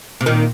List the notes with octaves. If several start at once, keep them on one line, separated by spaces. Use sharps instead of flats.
C3
A#2 D#3